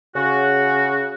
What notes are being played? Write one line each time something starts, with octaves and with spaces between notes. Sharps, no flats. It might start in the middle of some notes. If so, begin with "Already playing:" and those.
C#3 F#4